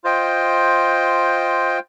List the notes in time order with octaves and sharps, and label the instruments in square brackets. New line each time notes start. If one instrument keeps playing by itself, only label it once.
[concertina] F4 C5 D#5 G5